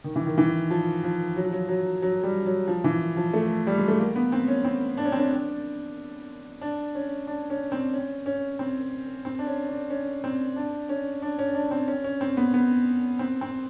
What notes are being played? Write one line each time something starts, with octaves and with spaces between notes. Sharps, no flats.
D#3
E3
D#3
E3
F3
F3
F#3
F3
F#3
F#3
F#3
G3
F#3
F3
E3
F3
A3
G3
G#3
A3
A#3
B3
C4
C#4
C4
D4
C#4
C4
C#4
D4
D4
C#4
D4
C#4
C4
C#4
C#4
C4
C4
D4
C#4
D4
C#4
C4
D4
C#4
D4
C#4
D4
C4
C#4
C#4
C4
B3
B3
C4
C4